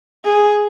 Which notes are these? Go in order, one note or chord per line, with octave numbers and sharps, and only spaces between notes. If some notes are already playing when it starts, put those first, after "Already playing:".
G#4